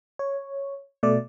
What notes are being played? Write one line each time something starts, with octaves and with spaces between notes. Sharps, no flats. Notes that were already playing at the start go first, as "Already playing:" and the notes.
C#5
B2 A3 D5